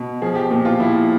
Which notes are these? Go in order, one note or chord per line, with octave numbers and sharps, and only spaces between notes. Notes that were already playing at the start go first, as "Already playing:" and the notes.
Already playing: B2
F3 G#4
G4
A#2
F4
F3 E4